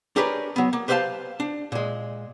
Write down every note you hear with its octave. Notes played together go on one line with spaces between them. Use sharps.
D4 G4 G#4 A#4 B4 C#5
F#3 B3
A#3
G4 B4 C5 D#5 F5 A5
D4
A#2 G#3